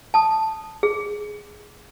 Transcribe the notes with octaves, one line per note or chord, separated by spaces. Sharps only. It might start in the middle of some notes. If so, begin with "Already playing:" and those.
A5 D#6
G#4